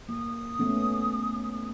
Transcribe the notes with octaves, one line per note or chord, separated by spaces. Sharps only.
A#3 D#6
A3 B3 C#4